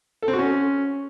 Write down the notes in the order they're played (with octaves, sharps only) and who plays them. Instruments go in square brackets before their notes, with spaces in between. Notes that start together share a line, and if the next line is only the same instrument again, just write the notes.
[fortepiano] A4
C4
F#4
C#4